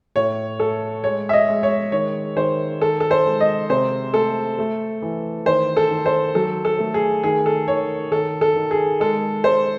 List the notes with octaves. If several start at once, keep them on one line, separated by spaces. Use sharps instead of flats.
A2 C#5
A3 A4
G#3 C#5
E5
D#5
G#3
C#5
D#3 C#5
D#3 C5
D#3 A4
A4
C5
G#3
D#5
C3 C5
A3 A4
A3
E3
D#3 C5
A4
D#3
C5
F#3 A4
A4
A3
G#4
D#3 G#4
A4
D#3 C#5
D#3 A4
A4
D#3
G#4
G#3 A4
G#3 C5